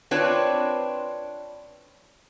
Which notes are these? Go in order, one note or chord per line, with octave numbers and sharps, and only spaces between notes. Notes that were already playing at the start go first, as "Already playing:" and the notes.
C4 D4 F4 B4 C#5